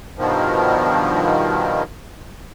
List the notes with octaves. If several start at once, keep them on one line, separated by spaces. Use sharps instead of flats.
G2 B2 D#3 F3